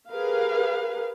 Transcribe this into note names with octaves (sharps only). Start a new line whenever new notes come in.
G4 G#4 A#4 B4 F5